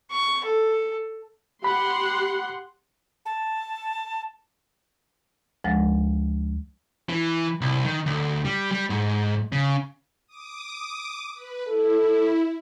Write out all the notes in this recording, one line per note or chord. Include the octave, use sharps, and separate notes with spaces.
C#6
A4
G4 F#5 B5 C6
A5
D2 F3 G#3 A6 A#6
E3
C2
D#3
D2
G3
G3
G#2
C#3
D6 D#6
B4
E4 A4